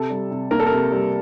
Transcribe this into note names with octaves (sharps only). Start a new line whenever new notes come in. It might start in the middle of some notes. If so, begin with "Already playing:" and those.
Already playing: C3 A4
G3
C3
A#3 A#4
A4
C3 A#4
G3